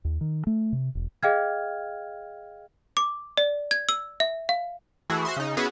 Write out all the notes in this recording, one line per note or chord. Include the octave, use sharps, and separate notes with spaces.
D#2
D#3
A3
C3
E1
G#4 D#5 F5 G5 F6 G#6
D6
D5
G#6
E6
E5
F5
E3 A3 E4 F#4 G#4
F#4 C5 E5 C6
C#3 D#4
B3 C#4 E4 F#4 G#4 B4